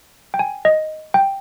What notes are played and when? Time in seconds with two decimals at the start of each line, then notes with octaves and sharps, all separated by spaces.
0.34 G5
0.39 G#5
0.65 D#5
1.14 G5